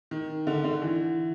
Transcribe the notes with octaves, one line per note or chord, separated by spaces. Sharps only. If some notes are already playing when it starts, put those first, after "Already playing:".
D#3
D3
D3
E3